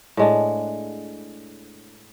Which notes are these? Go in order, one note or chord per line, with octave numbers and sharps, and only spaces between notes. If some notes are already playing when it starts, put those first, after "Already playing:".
A2 G#3 D4